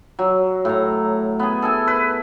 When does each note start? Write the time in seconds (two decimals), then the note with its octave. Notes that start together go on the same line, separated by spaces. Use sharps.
0.19 F#3
0.65 A2 A#5
1.39 B3 G#4
1.62 A4 E5 G#5
1.88 B4